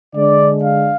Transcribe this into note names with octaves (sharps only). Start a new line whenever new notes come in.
D3 G#3 D4 D5
F5